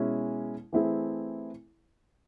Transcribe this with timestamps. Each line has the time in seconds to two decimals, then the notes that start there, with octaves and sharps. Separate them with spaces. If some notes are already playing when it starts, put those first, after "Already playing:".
Already playing: B2 G#3 C#4 E4
0.73 E3 A3 C4 E4 G#4